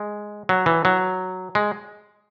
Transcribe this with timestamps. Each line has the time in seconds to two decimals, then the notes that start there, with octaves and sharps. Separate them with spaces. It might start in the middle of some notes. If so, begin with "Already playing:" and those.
Already playing: G#3
0.49 F#3
0.66 E3
0.85 F#3
1.55 G#3